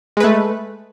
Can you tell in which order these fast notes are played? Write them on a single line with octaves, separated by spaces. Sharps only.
G#3 B4 A3